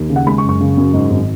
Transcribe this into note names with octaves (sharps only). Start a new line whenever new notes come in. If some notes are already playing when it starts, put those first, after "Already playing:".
Already playing: D#2
C#3
F#5
G#3 B5
C#6
F#1
C#6
C#3
F#2
G#2
G#1